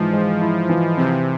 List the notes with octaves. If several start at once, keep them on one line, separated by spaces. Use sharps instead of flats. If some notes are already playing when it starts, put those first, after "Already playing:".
Already playing: G#2 E3 F3
G#3
E4
E3
C3 C4